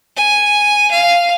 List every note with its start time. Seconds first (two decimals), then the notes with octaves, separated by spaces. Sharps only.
0.16 G#5
0.91 F5